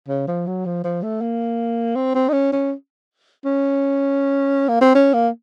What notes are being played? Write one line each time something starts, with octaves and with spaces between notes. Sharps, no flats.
C#3
F3
F#3
F3
F3
A3
A#3
C4
C4
D#4
C#4
C#4
C#4
A#3
C4
C#4
A#3